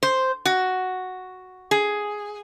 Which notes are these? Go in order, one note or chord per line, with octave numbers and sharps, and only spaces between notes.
C5
F#4
G#4